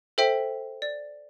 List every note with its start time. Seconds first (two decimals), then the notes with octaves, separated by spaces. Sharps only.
0.18 A4 C5 E5 G5 B6
0.82 D5